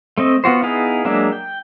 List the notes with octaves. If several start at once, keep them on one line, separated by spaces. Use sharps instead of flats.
A3 C4 D#5
B3 F4 F#4 C5
B3 D#4 E4 G#4 F5
F#3 G#3 A#3 D4 E5
G5